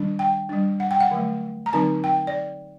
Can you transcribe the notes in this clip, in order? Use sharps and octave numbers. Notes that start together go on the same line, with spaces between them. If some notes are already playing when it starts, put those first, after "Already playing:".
Already playing: D#3 G3 D4
G5
G3 D4
F#5
G5
F#5
D3 F#3 A3
A#5
D3 F#3 C4 D#4 A5
G5
D5